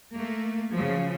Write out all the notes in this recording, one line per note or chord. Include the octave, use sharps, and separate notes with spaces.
A3 A#3
C#3 F3 F#3